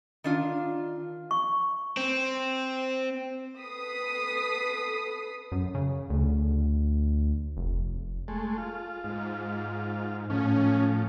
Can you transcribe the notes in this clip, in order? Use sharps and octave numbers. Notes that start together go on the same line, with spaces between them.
D#3 D4 F4
C#6
C4
A4 B4 D#6 B6 C7
F#2
C#3
D2
F1
G#3 A3
F4
G#2
A2 F3 C#4